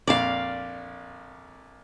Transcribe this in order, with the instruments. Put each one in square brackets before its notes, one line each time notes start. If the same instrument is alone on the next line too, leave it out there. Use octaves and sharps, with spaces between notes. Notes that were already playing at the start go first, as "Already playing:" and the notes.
[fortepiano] A#1 F2 D6 [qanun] D5 F5